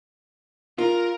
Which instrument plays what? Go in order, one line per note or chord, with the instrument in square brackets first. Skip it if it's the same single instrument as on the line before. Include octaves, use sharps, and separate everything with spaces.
[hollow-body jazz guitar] F4 [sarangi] A#4